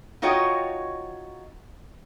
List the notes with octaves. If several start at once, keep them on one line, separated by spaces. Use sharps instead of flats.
D#4 F4 F#4 C#5 D#5 G5